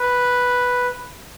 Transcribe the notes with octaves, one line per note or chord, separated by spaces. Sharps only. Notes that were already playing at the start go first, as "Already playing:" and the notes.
Already playing: B4